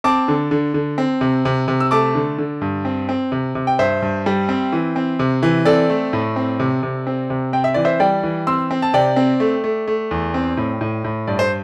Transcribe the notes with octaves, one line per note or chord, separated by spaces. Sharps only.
C4 A5 D6
D3
D3
D3
C4
C3
C3
C3
E6
A3 A5 D6
D3
D3
G2
C4
C4
C3
C3
G5
G2 C5 E5
G2
G3
C4
E3
C4
C3
E3
C4 A4 D5
A3
A2
C4
C3
C3
C4
C3
C4 G5
E5
E3 D5
C5 E5
G3 D5 G5
E3
C4 C6 E6
C4
A5
C3 D5 G5
C4
A3
A3
A3
E2
C4
A2
A2
A2
G2 D5
C5